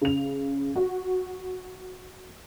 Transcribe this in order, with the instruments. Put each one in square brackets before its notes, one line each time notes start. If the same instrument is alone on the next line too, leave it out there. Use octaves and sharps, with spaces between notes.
[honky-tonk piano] C#3 F7
F#4